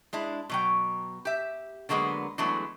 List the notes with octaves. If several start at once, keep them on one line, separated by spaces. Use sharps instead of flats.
G#3 D4 E4
B2 F#3 G5
G4 E5
D3 F#3 G#3 A#3 B3
E3 F#3 G#3 A3 B3 D4